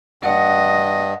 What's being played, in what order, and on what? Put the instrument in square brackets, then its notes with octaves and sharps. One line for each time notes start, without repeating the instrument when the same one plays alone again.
[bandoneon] G2 [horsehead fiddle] D#5 [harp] F#5